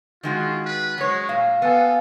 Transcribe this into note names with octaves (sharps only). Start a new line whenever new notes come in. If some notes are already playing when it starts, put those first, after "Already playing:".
D#3 G#3 F4 F#4
B4
F#3 G#3 C#5
A#2 F5
B3 A4 F5 G#5